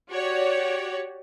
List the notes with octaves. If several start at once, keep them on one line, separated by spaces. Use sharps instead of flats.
F#4 G4 C#5 D5